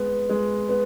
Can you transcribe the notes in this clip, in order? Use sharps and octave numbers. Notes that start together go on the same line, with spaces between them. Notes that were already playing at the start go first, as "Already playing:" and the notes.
Already playing: G#3 B3
G#3
B3